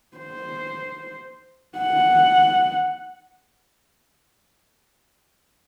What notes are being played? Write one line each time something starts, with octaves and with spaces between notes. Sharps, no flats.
C5
F#5